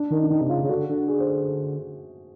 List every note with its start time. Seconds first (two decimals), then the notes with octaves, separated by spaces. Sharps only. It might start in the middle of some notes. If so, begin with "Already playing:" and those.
Already playing: D4
0.10 D#3
0.23 D4
0.30 D#3 D#4
0.41 C3
0.50 C#3 F4
0.63 C#3
0.69 D3 F#4
0.89 D3
1.08 G#4
1.20 C5